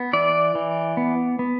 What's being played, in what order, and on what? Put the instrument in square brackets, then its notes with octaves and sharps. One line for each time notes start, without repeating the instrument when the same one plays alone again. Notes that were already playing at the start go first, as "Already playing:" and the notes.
Already playing: [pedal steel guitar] B3
E3 D5
E3
B3
B3